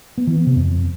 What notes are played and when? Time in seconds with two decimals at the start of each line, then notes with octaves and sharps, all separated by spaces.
0.18 B3
0.27 E3
0.37 B3
0.46 C3
0.56 F2